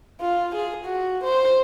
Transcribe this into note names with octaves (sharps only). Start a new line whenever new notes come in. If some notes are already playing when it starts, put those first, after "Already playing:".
F4
G#4
F#4
C5